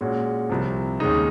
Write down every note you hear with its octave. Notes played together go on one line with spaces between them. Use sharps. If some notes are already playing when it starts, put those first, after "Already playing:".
A#2 G#3 C#4 F#4
C2 C3 F3
D#2 C#3 G#3 D#4